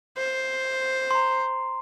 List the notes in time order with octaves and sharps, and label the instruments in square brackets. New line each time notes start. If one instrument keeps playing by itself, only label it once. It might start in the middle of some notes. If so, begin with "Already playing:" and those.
[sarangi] C5
[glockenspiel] A#5 C6